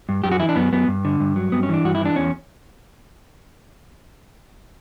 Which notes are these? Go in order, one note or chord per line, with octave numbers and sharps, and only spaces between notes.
G2
F#2 G4
F#4
E3 E4
D4
F#2 B3
F#2 B3
G2
D3
G2
F#3
G2 B3
C#4
E3 D4
G2 F#4
E4
E3 D4
E2 C#4